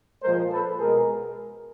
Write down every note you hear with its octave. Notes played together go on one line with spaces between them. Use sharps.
A#2 F3 G#3 A#4 C5
A4 B4
B2 G#3 G#4 A#4